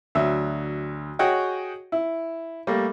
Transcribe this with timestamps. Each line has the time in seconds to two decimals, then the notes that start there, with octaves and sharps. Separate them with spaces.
0.15 D2 F#3 E5
1.19 F#4 G#4 C#5 D#5 F#5 G5
1.92 E4
2.67 G3 A3 A#3